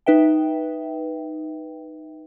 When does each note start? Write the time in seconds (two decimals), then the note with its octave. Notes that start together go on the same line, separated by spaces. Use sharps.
0.06 D#4 B4 E5 G5